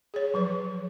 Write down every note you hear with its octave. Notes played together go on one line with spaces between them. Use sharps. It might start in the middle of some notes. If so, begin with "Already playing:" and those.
G#4 C#5
F3 F#3 B4